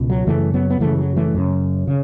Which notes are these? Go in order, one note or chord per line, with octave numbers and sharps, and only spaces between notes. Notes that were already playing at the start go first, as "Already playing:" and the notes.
Already playing: C#2 B2
F#3
F#2 C#3 E3 A3
F#3 B3
B3
F#2 C#3 E3 A3
F#3
E3 A3
F#2 C#3
C#3